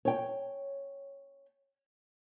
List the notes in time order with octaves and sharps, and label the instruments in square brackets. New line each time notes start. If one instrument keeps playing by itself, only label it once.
[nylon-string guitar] C#5 G5